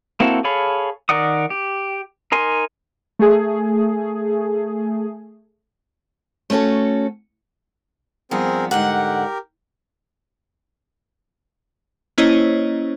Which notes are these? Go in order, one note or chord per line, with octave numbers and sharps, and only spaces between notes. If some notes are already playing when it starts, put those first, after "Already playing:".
A#3 C4 E4 F#4 A4
G#4 A4 C#5 F5 B5
D#3 A#4 D5 F#5 D#6
G4
D#4 A#4 G#5 C6
A3 G#4
A3 B3 C#4 F#4 A4
G2 F3 B3 C4 G#4 A#4
G#2 D3 G4 A#4 F#5
A#3 C#4 E4 C5 C#5 D#5